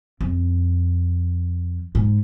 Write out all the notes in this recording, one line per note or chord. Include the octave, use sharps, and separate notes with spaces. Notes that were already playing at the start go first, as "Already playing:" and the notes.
F2
G#2